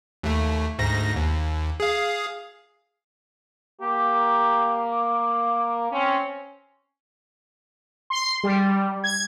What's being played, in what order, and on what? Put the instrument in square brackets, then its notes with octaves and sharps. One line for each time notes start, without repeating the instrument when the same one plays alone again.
[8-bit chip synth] D#2 A3
D2 G#2 A#6
D#2
G#4 F5
[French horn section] A#3 [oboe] G4
[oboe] D6
[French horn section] C4 C#4
[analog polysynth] C6
G3
G#6